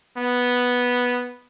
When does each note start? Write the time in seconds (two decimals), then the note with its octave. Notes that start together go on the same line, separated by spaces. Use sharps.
0.17 B3